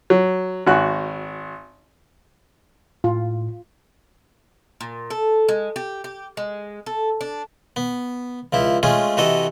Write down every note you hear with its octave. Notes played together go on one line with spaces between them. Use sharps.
F#3
G#1 F#4 F#6
A2 F4
A#2
A4
G#3
G4
G4
G#3
A4
D4
B3
C#2 F3 E4
G#3 A3 C#4 F4 G#4
C3 E3 F#4 A4 D#5